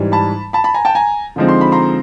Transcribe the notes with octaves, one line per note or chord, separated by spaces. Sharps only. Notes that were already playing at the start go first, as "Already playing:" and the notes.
Already playing: G#2 E3 G3
A5 B5
A5 B5
A5 B5
G#5 A#5
G5 A5
G#5 A#5
D3 F3 G#3 C4 D#4
C6
B5
A#5 C6